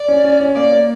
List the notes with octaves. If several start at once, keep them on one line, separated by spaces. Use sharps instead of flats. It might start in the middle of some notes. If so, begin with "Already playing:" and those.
Already playing: D5
C#4
C#4
C#4
A#3 D5
A#3